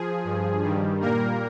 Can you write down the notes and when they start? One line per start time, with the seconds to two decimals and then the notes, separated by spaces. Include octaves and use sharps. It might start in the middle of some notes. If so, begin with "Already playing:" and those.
Already playing: F3 G#4
0.24 G2 F3
0.62 G2 D#3 G3
1.01 A#2 G3 A#3 A#4